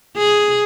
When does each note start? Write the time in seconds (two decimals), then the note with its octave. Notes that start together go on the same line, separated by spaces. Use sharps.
0.17 G#4